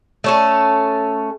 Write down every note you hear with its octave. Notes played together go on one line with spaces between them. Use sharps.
A3 C#4 A4